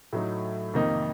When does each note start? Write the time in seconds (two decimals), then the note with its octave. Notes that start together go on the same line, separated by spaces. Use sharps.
0.13 A2 F#3 A3 D#4
0.74 F2 C3 D#3 A#3 D#4